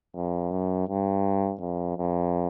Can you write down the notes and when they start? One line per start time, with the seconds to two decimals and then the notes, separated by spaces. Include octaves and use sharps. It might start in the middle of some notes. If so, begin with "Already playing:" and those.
0.15 F2
0.51 F#2
0.88 G2
1.60 F2
1.98 F2